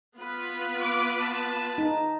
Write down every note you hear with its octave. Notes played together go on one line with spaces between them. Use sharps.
B3 F4 B4
D6
A5
D#4